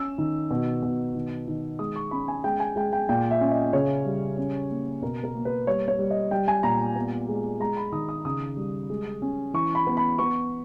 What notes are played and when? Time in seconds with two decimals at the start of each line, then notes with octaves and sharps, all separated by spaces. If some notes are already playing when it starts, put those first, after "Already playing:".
Already playing: C#4 E6
0.18 D#3
0.51 B2
0.83 B2
1.14 D#3
1.48 D#3
1.79 G#3 D#6
1.96 C#6
2.11 C#4 B5
2.28 G#5
2.44 G#3 G5
2.60 G#5
2.76 G#3 G5
2.93 G5
3.09 A#2 G5
3.31 E5
3.41 C#4
3.51 D#5
3.73 C#3 C#5
4.05 G3
4.37 C#4
4.70 A#3
5.02 B2 A#4
5.24 A#4
5.34 A#3
5.45 B4
5.67 G3 C#5
5.88 C#5
5.99 G3
6.10 D#5
6.31 G3 G5
6.48 G#5
6.63 A#2 A#5
6.96 B3
7.29 G#3
7.60 G#3 A#5
7.77 B5
7.92 D#3 D#6
8.09 D#6
8.25 C#3 D#6
8.57 G3
8.90 G#3
9.22 C#4
9.54 E3 C#6
9.75 B5
9.87 B3
9.97 B5
10.19 B3 C#6